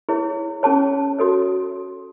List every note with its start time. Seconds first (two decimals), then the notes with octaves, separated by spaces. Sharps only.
0.09 E4 G#4 C#5
0.63 C#4 G#4 C#5 A5
1.19 F#4 A4 C#5